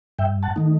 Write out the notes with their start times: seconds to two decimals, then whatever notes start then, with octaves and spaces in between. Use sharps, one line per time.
0.19 G2 E5 G5
0.43 F#5 A5
0.56 D#3 A3 D#4